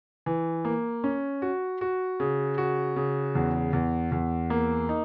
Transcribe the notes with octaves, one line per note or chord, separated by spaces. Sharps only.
E3
A#3
C#4
F#4
F#4
C#3
F#4
C#3
E2
E2
E2
A#3
D#4